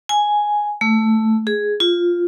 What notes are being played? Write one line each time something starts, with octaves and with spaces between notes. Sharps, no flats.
G#5
A3
G#4
F4